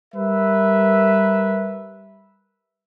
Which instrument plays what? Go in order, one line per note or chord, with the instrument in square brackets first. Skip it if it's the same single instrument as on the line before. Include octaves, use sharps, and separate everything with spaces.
[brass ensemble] G3 A#4 B4 E5